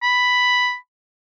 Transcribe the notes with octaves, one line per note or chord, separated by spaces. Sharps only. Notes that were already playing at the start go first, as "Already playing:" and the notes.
B5